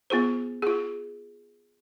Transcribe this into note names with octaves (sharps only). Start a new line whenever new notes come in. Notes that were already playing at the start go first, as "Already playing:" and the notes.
B3 F4 G#4 C5
F4 G#4